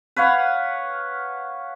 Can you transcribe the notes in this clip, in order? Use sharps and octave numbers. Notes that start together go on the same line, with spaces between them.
B4 C#5 F5 F#5